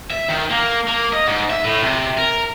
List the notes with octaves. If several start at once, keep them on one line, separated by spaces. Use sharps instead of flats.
E5
D#3
A#3
A#3
D#5
G#2
E5
A2
C3
A#4